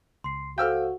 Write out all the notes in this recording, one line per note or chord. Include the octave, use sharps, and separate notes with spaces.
C#2 C6 C7
F#4 A4 C5 F5 G5 E6 F6